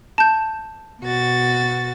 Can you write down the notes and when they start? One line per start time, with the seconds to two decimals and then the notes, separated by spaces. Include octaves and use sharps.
0.18 A5 G6
1.03 B2 F#4 A6